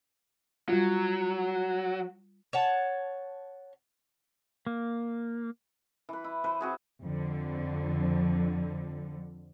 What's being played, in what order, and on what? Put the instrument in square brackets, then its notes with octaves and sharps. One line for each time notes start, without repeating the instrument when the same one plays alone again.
[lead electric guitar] F#3 [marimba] G3 F4
[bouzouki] C#5 F#5 A5
[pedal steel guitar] A#3
[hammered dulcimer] E3 B4
E4
E3 B4 C5
C4 F#4 G#4
[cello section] F2 D3